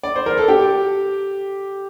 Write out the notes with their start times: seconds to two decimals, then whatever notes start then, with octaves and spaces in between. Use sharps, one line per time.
0.03 D5
0.16 C5
0.26 A#4
0.38 A4
0.48 G4